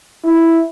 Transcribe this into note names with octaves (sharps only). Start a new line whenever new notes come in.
E4